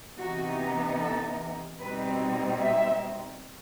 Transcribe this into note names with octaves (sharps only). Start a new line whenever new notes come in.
C3 E3 B3 D#4 F#4
A4
B2 G3 C4 D#4 B4
E5